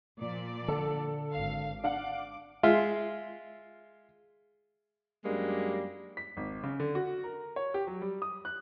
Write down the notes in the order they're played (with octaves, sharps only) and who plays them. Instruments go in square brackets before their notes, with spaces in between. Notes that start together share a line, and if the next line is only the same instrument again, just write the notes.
[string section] A#2 F3 D5
[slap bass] D3 [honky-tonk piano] A4
[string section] G#1 F5
[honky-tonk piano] D4 F5 F#5 [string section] D6
[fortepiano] G#3 F4 E5
[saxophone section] F#2 G3 G#3 A#3 D4
[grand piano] B6
G#1
C#3
D3
F#4
A#4
C#5
G4
F#3
G3
D#6
F#6